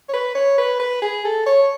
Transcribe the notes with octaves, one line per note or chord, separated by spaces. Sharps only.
C#5
B4
C#5
B4
B4
G#4
A4
C#5